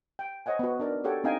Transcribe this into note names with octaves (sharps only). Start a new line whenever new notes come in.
G5
C5 C#5 D#5 F#5 G#5
B3 F#4
D4 D#4 A#4 D5
F#4 G4 A4 C#5 F#5 G5
C4 D4 D#4 F5 G5 G#5